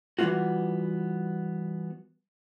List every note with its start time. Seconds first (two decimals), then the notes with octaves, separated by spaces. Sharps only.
0.19 E3 G3 B3 C4 F4 F#4